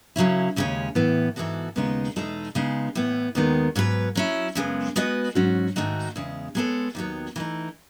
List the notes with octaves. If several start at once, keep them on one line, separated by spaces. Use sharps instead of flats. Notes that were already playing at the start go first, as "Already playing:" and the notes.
F#2 C#3 F#3 C#4 E4
D#2 C#3 G#3 C#4
A2 E3 B3
G#2 E3 B3 F#4 A4
D#2 C#3 G#3 B3 D#4
E2 B2 G#3 D#4 A4
C#3 G#3 B3 D#4
A2 E3 B3
D#2 D#3 G#3 B3
G#2 F#3 B3 F#4 B4
F#3 C#4 E4
F#2 C#3 G#3 B3
G#3 B3 F#4 B4 D#5
G#2 F#3 C#4 F#4
G#2 D#3 A3 D#4 F#4
E2 C#3 G#3
G#3 B3 D#4 A4 C#5
D#2 D#3 F#3 B3
E3 A3 D#4